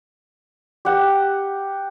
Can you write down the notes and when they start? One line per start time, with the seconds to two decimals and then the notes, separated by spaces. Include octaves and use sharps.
0.85 G4 F#5